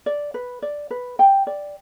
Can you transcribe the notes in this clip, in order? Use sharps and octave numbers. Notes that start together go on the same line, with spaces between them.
D5
B4
D5
B4
G5
D5